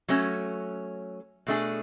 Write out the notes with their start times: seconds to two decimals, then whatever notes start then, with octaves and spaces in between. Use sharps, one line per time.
0.08 F#3 A3 C#4
1.47 B2 A3 D4 G#4